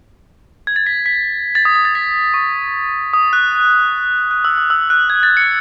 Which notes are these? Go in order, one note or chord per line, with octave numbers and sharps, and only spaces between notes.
G#6
A6
B6
B6
A6
D#6
D#6
A6
B6
C#6
D#6
F#6
F#6
E6
D#6
E6
F#6
G#6
A6
C#7